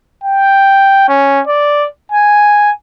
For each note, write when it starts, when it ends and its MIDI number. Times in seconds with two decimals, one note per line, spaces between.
0.24 1.03 79
1.08 1.40 61
1.47 1.88 74
2.12 2.71 80